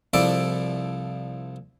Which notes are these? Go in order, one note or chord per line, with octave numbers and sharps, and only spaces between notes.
C2 F3 E4 A4 D5 D6